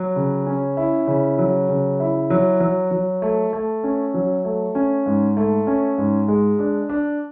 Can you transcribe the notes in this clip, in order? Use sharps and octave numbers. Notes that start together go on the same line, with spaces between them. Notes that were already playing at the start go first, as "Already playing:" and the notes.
Already playing: F#3
C#3
C#4
E4
C#3
F#3
C#3
E4
F#3
F#3
F#3
A3
A3
C#4
F#3
A3
C#4
G#2
A3
C#4
G#2
G#3
D4
D4